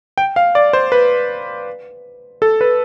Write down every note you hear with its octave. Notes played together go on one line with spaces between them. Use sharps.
G5
F5
D5
C5
B4
A4
B4